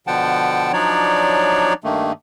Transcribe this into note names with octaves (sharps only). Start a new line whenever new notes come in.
B2 D3 F3 F#5 G5 A5
F3 F#3 D4 D#4 C#5 D5
G2 D#3 A3 A#3